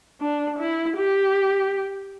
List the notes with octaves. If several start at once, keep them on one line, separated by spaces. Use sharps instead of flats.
D4
E4
G4